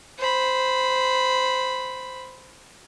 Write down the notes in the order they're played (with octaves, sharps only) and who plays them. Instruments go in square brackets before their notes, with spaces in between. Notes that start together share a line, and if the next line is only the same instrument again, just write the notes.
[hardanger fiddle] C5 B5